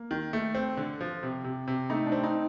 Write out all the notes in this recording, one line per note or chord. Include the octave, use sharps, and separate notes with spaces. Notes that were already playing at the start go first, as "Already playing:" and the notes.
Already playing: A#3
D#3
A3
C4
D3
F3
C3
C3
C3
A3 D#4
D4
C4
D#4